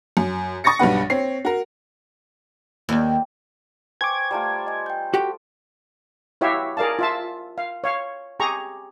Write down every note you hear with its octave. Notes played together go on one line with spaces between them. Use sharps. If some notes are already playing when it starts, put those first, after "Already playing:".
F#2
C#6 D#6 A6 A#6 C#7
B1 G2 G3 B4 F#5
C4 C#5 C7
F#4 A#4
D#2
C5 G5 G#5 C#6 D6 G#6
G3 A3 F4 G5 A#5
D#5 G#5
G5 G6
F#4 G4 A4 G5
E4 F#4 G4 C#5 E5 F5
G#4 A#4 D5 F5 A5
F4 E5 A5
F5
C#5 F5 C#6
G4 G#4 A#5 C#6